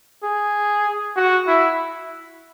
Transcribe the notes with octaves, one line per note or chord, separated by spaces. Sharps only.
G#4
F#4
E4